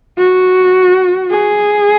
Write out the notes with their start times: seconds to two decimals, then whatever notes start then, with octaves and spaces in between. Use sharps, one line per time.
0.18 F#4
1.31 G#4